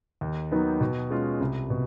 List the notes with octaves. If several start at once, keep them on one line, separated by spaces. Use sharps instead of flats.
D#2
D#3 F#3 B3 D#4
B2
G#3 C#4 F4
C2
B2